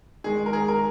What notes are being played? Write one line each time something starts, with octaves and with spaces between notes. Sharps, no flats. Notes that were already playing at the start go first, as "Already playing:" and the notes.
D#3 G#3 G#4
A#4
G#4
A#4